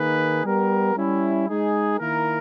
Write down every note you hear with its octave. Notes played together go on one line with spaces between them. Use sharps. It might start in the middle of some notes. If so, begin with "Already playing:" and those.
Already playing: D#3 A#3 D#4 G#4 B4
G3 B3 G4 A#4
G3 C#4 E4
G#3 D#4 G#4
D#3 A#3 E4 A#4